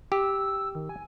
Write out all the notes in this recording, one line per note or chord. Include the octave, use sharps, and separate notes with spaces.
G4 E6
D#3
G#5